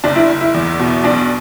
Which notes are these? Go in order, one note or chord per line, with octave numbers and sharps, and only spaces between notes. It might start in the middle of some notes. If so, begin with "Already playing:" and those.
F#1 D4
E4
F#1
E4
E2
B2
B1 D4